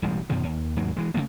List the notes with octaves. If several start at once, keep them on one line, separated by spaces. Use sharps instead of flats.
E1 A1 G3 G#3
F#2 B2 D#3 F3
D#2
D#2 G#2 F#3 A#3
E3 G#3
C#3 F3 A3 A#3